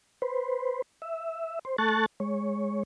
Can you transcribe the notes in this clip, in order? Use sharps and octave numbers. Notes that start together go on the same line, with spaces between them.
B4 C5
E5
C5
A3 A4 A5 C#6 F#6 A6
G#3 C#5